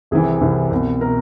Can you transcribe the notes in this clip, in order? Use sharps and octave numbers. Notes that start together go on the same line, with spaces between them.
C2 C3 E3 G#4
C2 C3 E3
C2 B2
B2 A#4